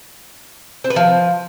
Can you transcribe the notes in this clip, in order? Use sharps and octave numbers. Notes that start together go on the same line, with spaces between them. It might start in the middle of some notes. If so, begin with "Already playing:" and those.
C4
B4
F3